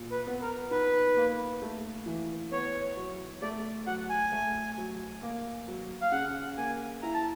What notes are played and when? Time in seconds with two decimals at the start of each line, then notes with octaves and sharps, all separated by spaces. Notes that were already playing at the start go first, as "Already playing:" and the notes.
Already playing: A#2
0.11 B4
0.27 B3
0.42 A#4
0.71 D#4 B4
1.17 A#3
1.62 A3
2.06 E3
2.52 B3 C#5
2.97 F#3
3.42 A3 D5
3.86 F#3 F#5
4.09 G#5
4.32 A3
4.78 F#3
5.22 A#3
5.68 F#3
6.02 F5
6.12 C#3 F#5
6.57 A#3 G#5
7.02 E4 A#5
7.14 A5